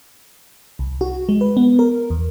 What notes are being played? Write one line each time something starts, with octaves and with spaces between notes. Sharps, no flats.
C2
F#4
G#3
B4
B3
A#4
E2